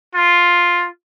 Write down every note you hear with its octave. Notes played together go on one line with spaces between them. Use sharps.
F4